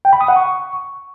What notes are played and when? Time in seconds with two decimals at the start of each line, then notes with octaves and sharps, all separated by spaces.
0.05 G5
0.13 B5
0.21 D#6
0.28 F#5
0.36 C#6